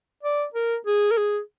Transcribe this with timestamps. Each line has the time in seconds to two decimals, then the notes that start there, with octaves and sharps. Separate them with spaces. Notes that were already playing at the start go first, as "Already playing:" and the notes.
0.23 D5
0.54 A#4
0.86 G#4
1.11 A#4
1.18 G#4